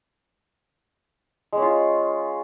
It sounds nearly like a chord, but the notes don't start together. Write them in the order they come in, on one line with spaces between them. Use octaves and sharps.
G#3 C#4 F4